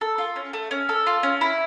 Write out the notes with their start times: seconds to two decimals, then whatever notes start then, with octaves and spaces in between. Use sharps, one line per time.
0.01 A4
0.18 F4
0.36 C#4
0.53 A3
0.71 C#4
0.89 A4
1.07 F4
1.23 C#4
1.41 E4